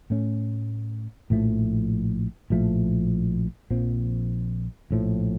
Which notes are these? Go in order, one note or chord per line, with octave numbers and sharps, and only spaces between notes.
A2 A3 C#4
A#1 A2 F3 A3
A#1 A2 F3 A3
A#1 A#2 F3 C4
A#1 A2 F3